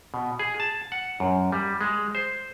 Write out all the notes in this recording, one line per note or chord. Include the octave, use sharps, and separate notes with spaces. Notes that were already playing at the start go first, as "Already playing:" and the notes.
B2
G#4
A5
F#5
F#2
G3
G#3
C5